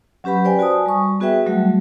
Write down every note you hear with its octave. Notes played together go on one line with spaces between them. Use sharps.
F#3 C#4 G4 B4 B5
B4 C5 D5 G5 G#5
F#4 D5 G#5 A5 D#6
G3 C#6
B3 F#4 G#4 B4 E5 G5
F#3 G3 A3 F#4